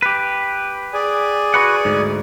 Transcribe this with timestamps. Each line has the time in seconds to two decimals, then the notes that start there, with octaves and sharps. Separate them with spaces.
0.02 G4 B4
0.93 G#4 D5 G#5
1.54 F#4 B4 F#5
1.85 D2 G#2